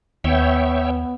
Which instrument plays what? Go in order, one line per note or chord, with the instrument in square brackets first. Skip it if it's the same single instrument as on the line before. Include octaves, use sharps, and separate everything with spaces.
[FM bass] D#2 [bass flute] B3 [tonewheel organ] C#5 E5 G5